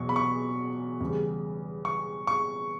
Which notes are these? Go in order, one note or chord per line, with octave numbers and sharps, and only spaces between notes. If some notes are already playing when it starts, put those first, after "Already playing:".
Already playing: E2 B2 F#3 C#6
B5
C#6
E2 C#3 G3
C#6
C#6